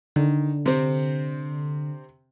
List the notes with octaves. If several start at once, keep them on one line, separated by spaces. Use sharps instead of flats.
D3 D#3
C3 C4